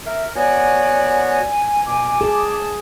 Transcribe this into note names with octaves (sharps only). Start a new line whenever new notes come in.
A#4 E5
B3 F#4 C#5 D5 G#5
B2 D6
G#4 A5